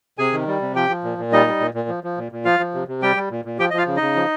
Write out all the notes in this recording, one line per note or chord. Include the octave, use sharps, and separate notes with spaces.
C3 G#4 G#5
D#3
G3
C3
F3 G4 G5
F3
A#2
A#2
G3 D#4 D#5
G3
A#2
A#2
F3
F3
A#2
A#2
F3 F4 F5
F3
C3
C3
G3 G4 G5
G3
A#2
A#2
F3 G4 G5
D#5
F3 F4 F5
C#3
D#4 D#5
C#3
F3